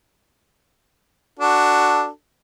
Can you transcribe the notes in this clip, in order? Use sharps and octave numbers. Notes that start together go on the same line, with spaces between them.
D4 F#4 A4